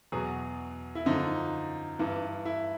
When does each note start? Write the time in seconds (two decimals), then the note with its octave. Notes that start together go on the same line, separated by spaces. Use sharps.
0.12 E2 B2 F#3 G#4
0.95 E4
1.06 F#2 D3 F3 D#4
1.99 G2 E3
2.45 E4